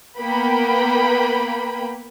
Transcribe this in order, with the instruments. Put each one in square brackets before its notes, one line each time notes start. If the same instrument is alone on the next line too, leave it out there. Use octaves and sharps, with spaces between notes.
[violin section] A#3 B3 G5 B5